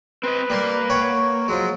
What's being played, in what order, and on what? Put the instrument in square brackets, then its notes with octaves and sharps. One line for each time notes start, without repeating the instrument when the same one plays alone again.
[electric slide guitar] C4 C5 D#5 [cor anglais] B4
[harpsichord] G3 C6 [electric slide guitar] A#3
[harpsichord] C#5 F#5 G5
[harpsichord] F3 G#3 [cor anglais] F#3